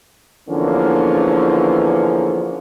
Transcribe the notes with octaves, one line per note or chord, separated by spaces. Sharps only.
E2 D3 E3 F3 A#3 C#4